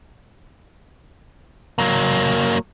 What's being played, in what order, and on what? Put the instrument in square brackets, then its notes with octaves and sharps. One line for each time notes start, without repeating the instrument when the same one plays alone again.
[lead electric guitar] F#3 A#3